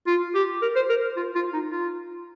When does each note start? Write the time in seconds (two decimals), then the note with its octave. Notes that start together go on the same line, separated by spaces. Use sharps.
0.07 F4
0.35 G4
0.62 A#4
0.76 C5
0.89 A#4
1.16 F4
1.35 F4
1.53 D#4
1.71 F4